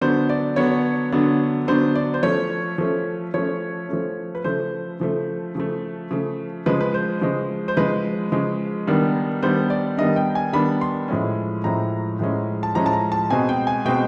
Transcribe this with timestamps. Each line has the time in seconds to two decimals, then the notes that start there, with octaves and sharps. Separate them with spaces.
0.01 D3 F#3 B3 D4 C5
0.29 D5
0.56 D3 F#3 B3 D4 C#5
1.12 D3 F#3 B3 D4
1.67 D3 F#3 B3 D4 C5
1.95 D5
2.14 C5
2.23 F3 A3 C#4 C#5
2.78 F3 A3 C#4
3.34 F3 A3 C#4 C#5
3.89 F3 A3 C#4
4.35 B4
4.44 C#3 F3 A3 C5
5.00 C#3 F3 A3
5.55 C#3 F3 A3
6.11 C#3 F3 A3
6.66 C#3 F3 G#3 B4
6.81 B4
6.94 C5
7.21 C#3 F3 G#3
7.68 C5
7.77 C#3 F3 G#3 B4
8.32 C#3 F3 G#3
8.87 D#3 G3 B3 D4
9.42 D#3 G3 B3 D4 C5
9.70 D5
9.98 D#3 G3 B3 D4 D#5
10.16 G5
10.35 G#5
10.53 D#3 G3 B3 D4 B5
10.81 C6
11.08 A2 F3 G#3 C#4
11.64 A2 F3 G#3 C#4 A#5
12.19 A2 F3 G#3 C#4
12.63 A5
12.75 A2 F3 G#3 C#4 A#5
12.86 A5
12.93 A#5
13.12 A5
13.30 B2 G#3 C4 G#5
13.49 G5
13.67 G#5
13.85 B2 G#3 C4 G5